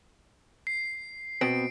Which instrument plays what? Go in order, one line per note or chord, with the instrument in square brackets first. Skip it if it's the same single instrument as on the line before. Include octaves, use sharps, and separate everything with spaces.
[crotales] C7
[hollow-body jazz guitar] B2 B3 C4 [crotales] D7